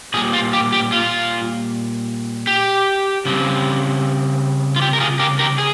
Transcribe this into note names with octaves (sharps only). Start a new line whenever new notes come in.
A#2 G3 G#4
F4
G4
G4
F4
G4
C#3 G3 C4
F4
G4
A#4
F4 G#4
G4 A#4
G4 A#4
G#4